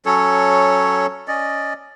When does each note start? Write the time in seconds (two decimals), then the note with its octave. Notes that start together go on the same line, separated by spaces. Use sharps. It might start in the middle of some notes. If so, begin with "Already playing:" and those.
0.06 F#3 C#4 A4 C#5
1.28 C#4 D5 D#5